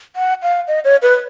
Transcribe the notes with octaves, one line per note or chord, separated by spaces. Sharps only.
F#5
F5
D#5
C#5
B4